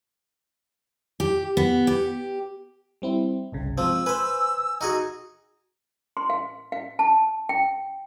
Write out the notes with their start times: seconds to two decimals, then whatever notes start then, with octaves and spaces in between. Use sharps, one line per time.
1.20 G4
1.57 B3
1.87 G4
3.02 G3 C4 E4
3.52 G1 C2 C#3
3.78 F3 G#3 C4 E6
4.06 B4 C5 G#5
4.81 D#4 F#4 G#4
6.17 C6
6.30 F5
6.72 F5
6.99 A5
7.49 G5